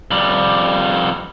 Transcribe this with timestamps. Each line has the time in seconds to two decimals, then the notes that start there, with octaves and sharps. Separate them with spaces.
0.11 F2 G3